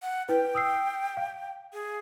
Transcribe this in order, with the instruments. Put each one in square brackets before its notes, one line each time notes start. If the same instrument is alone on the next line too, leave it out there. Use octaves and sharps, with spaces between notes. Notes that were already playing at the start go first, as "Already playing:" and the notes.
[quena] F#5
[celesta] E4 B4 [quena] G5
[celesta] D#6 E6 C7
F5
[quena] G#4